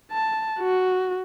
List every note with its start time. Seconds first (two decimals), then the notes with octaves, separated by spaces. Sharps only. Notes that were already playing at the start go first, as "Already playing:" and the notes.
0.13 A5
0.60 F#4